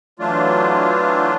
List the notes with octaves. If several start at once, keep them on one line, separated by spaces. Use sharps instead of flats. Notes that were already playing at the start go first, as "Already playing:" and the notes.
E3 F#3 A3 D4 F4